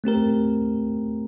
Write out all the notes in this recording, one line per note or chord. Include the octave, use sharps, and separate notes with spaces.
A3 C4 G4 A#4